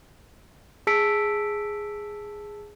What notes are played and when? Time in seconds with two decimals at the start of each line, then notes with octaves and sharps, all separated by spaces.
0.87 G#4 A5 E6 B6 C#7 D7